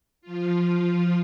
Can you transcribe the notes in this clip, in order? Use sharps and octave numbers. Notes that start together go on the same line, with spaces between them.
F3 F4